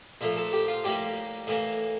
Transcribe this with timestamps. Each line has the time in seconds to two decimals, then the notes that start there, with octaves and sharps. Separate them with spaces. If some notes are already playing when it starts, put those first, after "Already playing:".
0.21 A#2 F3 A3
0.37 A4
0.53 G4
0.68 F4
0.84 A2 G3 A#3 G4
1.47 A2 E3 A#3